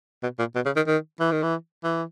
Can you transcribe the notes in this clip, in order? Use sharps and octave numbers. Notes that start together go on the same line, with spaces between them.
B2
A#2
B2
C#3
D#3
D#3
E3
D#3
E3
E3